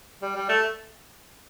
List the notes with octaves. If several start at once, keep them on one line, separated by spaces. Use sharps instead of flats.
G3
G3
A3